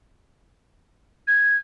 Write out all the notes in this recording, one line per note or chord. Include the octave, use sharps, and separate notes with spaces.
G#6